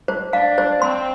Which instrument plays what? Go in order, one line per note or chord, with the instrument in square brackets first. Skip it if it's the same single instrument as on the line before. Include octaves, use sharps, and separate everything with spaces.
[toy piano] C5
[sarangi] D4 [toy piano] F5
[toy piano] C5
[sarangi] C4 [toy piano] C6